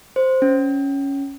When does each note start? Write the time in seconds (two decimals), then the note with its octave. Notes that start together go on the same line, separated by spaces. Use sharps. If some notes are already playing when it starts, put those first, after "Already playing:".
0.16 C5
0.42 C#4